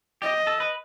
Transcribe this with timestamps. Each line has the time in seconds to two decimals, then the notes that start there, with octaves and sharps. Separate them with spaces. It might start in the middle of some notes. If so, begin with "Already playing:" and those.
0.22 G4 D#5
0.47 A4
0.60 B4